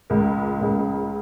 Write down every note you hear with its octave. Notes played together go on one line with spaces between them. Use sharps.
C#2 C#3 G#3 A#4
C#2 C#3 G#3